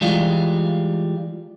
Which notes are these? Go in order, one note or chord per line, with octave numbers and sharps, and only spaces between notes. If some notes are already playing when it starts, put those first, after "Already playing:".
E3 G3 G#3 F4